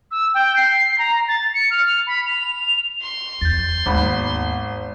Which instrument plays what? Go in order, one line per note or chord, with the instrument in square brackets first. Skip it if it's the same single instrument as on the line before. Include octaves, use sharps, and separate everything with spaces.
[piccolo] E6
G5
C7
A#5
A6
C#7
F6
B5
F7
[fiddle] C6
[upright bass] E2 [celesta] G6 A6
[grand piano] G#1 G#2 B5 [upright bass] D#2 B3